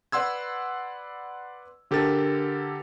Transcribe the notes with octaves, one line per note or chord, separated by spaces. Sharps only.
B4 D5 F#5 C6 E6 G#6
D3 G4 A4 A#4 A6